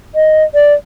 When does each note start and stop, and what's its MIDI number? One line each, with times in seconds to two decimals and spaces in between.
0.15 0.44 75
0.55 0.74 74